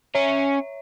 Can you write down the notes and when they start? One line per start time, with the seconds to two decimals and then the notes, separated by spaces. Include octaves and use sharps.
0.15 C#4 C#5 E5